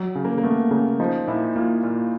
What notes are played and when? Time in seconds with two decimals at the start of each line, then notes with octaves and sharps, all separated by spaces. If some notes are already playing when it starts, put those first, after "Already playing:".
Already playing: F#3
0.15 C#3
0.25 A#3
0.38 A#3
0.43 A3 B3
0.71 C#3 A#3
1.00 F3 D#4
1.28 A#2 E4
1.56 A#3 F4
1.83 A#2 F4